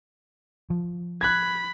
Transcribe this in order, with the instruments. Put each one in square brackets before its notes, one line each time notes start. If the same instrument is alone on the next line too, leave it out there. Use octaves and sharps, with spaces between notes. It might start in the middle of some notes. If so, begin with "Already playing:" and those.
[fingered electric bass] F3
[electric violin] B5 [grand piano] F#6 G#6